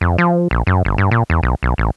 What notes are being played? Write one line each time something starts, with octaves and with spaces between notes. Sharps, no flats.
F2
F3
A#1
F#2
G1
G2
A#2
E2
B1
B1
A1